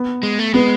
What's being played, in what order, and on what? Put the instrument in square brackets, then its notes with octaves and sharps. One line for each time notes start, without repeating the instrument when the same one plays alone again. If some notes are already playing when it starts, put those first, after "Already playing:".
Already playing: [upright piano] B3
[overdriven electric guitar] G#3
A3
[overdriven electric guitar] G#3 [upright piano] B3